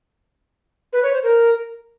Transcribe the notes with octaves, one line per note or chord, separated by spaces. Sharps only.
B4
C#5
C5
A#4